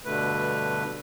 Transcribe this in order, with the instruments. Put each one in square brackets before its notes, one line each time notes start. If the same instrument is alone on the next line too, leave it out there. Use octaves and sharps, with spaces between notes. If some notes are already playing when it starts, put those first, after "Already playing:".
[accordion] G2 B2 D3 A3 B4